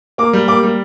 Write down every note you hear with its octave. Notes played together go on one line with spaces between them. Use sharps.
A#3 D6
G3
A#3 D6
G3